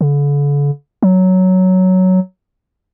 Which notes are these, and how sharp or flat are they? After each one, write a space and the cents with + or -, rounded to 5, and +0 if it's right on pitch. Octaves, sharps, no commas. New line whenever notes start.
D3 -40
F#3 +5